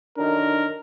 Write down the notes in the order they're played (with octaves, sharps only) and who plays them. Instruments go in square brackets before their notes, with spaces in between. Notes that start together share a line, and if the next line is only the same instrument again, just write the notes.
[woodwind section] F#2 D3 D#3 [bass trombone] D4 [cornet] A#4